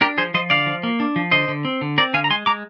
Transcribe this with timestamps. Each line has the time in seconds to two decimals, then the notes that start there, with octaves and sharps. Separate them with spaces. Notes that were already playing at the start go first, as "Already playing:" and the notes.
0.01 D4 G4 A#4
0.18 F3 G#4 C5
0.34 F3 C5 D#5
0.50 D3 D5 F5
0.66 F3
0.83 A#3
1.00 D4
1.16 F3
1.31 D3 C5 D#5
1.48 D3
1.65 C4
1.81 D3
1.98 C4 A#4 D5
2.14 D3 F5 G#5
2.24 A#5
2.30 G#3 G#5 C6
2.46 G#3 A#5 D6